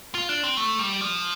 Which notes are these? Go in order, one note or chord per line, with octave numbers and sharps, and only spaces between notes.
F4
D4
C4
A3
G3
F3